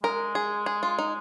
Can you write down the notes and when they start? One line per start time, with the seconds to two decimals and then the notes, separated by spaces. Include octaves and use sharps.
0.03 G#3 A#4
0.35 G#4
0.66 G#4
0.83 F4
0.99 D#4